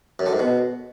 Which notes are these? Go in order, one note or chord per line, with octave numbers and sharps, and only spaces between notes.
F#2
D3
G#2
B2